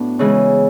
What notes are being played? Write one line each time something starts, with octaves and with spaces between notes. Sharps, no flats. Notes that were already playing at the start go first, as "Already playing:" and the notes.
Already playing: A2 B3 D4 F#4
C#3 E3 G#3